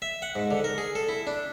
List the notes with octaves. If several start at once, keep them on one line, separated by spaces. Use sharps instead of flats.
E5
F#5
G#2
D3
A#4
G#4
A4
E4
D4